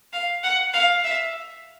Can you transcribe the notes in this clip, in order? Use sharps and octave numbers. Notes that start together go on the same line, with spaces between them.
F5
F#5
F5
E5